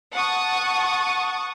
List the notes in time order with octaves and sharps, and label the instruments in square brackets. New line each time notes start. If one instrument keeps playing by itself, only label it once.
[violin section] F#5 A5 C#6 D#6